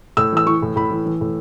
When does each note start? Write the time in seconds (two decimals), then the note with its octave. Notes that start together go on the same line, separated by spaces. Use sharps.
0.17 A2 E6
0.32 E3 E6
0.46 E3 C#6
0.62 A2
0.76 A2 B5
0.90 E3
1.06 E3
1.21 A2